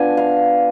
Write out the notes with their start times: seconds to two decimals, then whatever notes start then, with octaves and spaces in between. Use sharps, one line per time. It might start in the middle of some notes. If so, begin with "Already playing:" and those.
Already playing: F3 B3 D4 G#5
0.17 F5